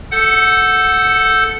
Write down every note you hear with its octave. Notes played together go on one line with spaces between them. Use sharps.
A4 F#5 G6